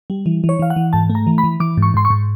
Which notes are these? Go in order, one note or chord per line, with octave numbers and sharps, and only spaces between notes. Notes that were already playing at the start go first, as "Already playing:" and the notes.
G3
E3
E3
C#5
E3 F5
F#5
E3
G#2 A5
A3
A#5
E3
B5
E3
E3 D6
G#2
C#6
G#2 C6
C#6
G#2